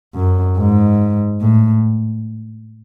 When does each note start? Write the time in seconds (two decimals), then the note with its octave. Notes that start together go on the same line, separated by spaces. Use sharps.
0.15 F#2
0.57 G#2
1.41 A2